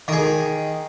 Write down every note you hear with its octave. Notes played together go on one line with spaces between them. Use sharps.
D#3 G#4